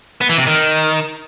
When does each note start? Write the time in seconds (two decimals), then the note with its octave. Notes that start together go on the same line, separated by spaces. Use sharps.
0.21 B3
0.29 E3
0.38 C3
0.46 D#3